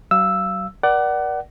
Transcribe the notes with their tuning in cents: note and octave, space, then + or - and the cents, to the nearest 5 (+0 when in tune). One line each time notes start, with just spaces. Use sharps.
F#3 +40 F5 -20 E6 +0
A#4 +40 D5 +5 F#5 +25